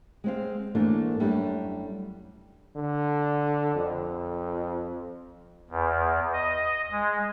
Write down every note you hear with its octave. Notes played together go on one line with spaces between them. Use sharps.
G#3 C4 F5
G#2 E3 A3 A#3 D4
F#2 G3 A3 D4
D3
F2
E2
D#5
G#3